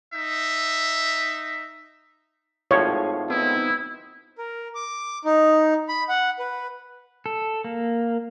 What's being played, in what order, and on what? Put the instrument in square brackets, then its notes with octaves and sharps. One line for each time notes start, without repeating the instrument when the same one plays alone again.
[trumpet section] D#4 E5
[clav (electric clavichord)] G#1 A2 F3 [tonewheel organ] G#4 [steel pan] C#5
[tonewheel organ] B3 C4 D#4 [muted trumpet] E4
[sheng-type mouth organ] A#4
D6
D#4
B5
F#5
B4
[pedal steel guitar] A4
A#3